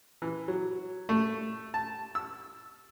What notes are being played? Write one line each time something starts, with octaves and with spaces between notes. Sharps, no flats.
E3
F#3
A3
A5
E6